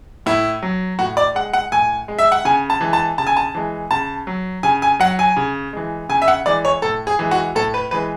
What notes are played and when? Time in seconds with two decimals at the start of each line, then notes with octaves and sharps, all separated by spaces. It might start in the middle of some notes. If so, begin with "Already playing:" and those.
0.26 A2 E4
0.62 F#3
0.99 A2 F#4
1.17 D5
1.35 G#3 F#5
1.53 F#5
1.72 A2 G#5
2.08 G#3
2.19 E5
2.32 F#5
2.45 C#3 G#5
2.70 A5
2.81 E3 G#3
2.93 A5
3.18 C#3 A5
3.27 G#5
3.37 A5
3.55 E3 G#3
3.91 C#3 A5
4.27 F#3
4.63 C#3 G#5
4.82 G#5
4.99 F#3 F#5
5.19 G#5
5.37 C#3
5.73 E3 G#3
6.09 C#3 G#5
6.22 E5
6.28 F#5
6.46 E3 G#3 D5
6.65 C#5
6.82 A2 A4
7.07 G#4
7.19 E3 G#3
7.31 F#4
7.55 A2 A4
7.74 B4
7.91 E3 G#3 B4